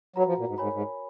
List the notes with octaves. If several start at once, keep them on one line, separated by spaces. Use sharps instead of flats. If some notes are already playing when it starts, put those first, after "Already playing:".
F#3 F#4 B4 F#5 A#5
F3
A#2
G#2
G#2 A#4 C#5 G#5 B5
G#2